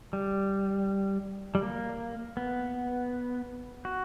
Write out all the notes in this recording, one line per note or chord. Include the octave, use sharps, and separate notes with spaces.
G3
G3
A#3
B3
F#4